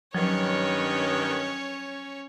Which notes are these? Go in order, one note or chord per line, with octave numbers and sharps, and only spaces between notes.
G2 D#3 F3 F#3 C#4 C#5